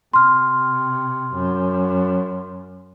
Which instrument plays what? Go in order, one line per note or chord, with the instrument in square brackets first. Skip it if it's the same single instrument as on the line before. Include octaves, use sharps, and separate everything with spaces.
[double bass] C3 [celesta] C6 F6
[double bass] F#2